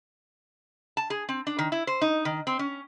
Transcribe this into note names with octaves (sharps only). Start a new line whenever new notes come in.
A5
G#4
C4
D4
D#3
E4
C5
D#4
D#3
C4
C#4